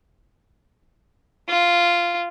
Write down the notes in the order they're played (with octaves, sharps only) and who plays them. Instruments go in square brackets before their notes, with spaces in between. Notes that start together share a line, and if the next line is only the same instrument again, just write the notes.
[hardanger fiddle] F4